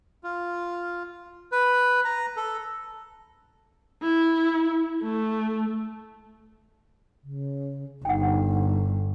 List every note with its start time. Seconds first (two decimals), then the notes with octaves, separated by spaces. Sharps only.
0.24 F4
1.52 B4
2.05 A#5
2.37 A4
4.03 E4
5.03 A3
7.23 C#3
8.05 G1 D#4 F#5 G5